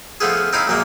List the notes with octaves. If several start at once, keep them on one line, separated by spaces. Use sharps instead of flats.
F3 A3 B3 F4 G#4
C4 D#4 E4 F5 B5
A#1 F#2 F#3 G#3 A#3